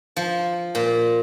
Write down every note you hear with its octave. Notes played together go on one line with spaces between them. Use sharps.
F3
A#2